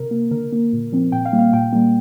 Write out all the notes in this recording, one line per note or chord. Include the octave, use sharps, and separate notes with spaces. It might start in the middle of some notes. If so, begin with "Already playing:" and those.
Already playing: C3 A#4
A#3
D3 A#4
A#3
A#2
F3 C4
A#2 G5
F5
G3 A#3
F5
A#2 G5
G3 A#3